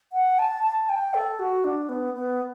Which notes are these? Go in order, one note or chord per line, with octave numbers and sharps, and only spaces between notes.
F#5
A5
A5
G5
A4
F#4
D4
B3
B3